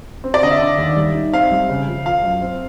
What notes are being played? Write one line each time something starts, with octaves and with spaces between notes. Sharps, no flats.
C4
D5
D3 D#5
E5
D3
D#2
G3
D#4
C4 F5
G3
C#3
F3
F3 F5
F#2
C4